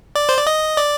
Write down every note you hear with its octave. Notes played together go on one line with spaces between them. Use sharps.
D5
C5
D5
D#5
D5